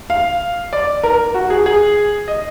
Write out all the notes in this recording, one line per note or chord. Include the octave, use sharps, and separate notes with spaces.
F5
D5
A#4
F#4
G#4
G#4
D#5